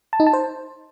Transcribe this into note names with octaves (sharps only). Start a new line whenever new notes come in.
A5
D#4
A5
C5